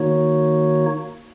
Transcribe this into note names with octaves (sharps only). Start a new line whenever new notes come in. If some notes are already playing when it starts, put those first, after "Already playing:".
Already playing: D#3 A#3 D#4 F#4 C#5